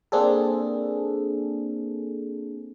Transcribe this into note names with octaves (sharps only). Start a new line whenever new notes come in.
A#3 C4 D4 G#4 A4